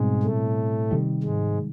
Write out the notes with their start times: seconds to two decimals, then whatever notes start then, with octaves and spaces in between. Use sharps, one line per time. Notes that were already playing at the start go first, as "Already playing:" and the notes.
Already playing: G#2 B2 G3 G#3 C4
0.23 A2 A3
0.91 C3 D#3 G3
1.23 G#2 G#3